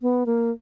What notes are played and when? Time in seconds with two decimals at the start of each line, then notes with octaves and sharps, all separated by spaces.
0.02 B3
0.26 A#3